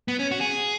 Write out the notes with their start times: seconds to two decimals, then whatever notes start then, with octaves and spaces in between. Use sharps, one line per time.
0.08 B3
0.19 C#4
0.31 F#4
0.41 G#4